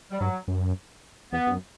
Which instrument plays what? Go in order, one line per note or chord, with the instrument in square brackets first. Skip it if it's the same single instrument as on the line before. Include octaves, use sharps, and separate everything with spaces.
[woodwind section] G3
[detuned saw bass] G2 [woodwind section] F#3
[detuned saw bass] F#2
[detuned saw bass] E2 [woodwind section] B3
[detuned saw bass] G2
F#2